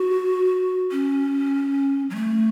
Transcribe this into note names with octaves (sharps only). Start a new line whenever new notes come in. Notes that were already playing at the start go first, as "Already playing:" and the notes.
Already playing: F#4
C#4
F#3
A3